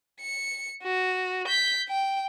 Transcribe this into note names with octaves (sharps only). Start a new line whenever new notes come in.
C#7
F#4
G6 B6
G5